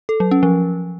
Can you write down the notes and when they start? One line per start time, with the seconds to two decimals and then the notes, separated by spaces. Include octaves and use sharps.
0.09 A4
0.20 F#3
0.31 C#4
0.43 F3